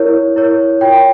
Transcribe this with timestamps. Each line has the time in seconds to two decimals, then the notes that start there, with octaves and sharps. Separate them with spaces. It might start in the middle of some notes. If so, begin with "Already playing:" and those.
Already playing: E4 A#4 C#5
0.36 E4 A#4 C#5
0.81 F4 C#5 G5